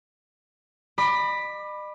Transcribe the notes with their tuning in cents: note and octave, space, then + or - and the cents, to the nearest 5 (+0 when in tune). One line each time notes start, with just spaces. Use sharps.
D#5 -45 B5 +0 D6 +25